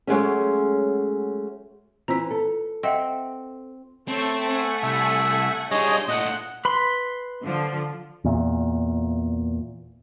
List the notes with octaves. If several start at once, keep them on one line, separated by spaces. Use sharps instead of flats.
F#3 G#3 A3 C#4
E3 C4 F4 A#5 E6 B6
A4
C4 D#5 E5 F#5
A3 C4 A4 C#5 C#6
F#5 G#5 C#7
C2 E5
G3 D4 D#4 F4 G#4 C#5 D#5 G6
A#2 A3 D#5 F#5
B4 B5 C6
D3 F3
E2 A#2